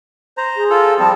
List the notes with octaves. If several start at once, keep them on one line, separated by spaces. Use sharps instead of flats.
C5 A#5
G#4
F4 A4
F3 G3 C4 A5